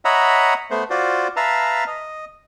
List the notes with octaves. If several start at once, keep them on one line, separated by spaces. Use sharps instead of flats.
C#5 D#5 E5 F#5 A#5 B5
A3 B3 C5
F4 F#4 C5 D5
B4 E5 F5 A5 A#5
D#5